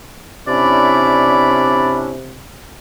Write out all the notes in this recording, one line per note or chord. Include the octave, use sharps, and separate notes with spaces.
C3 C#4 D4 E4 D5 B5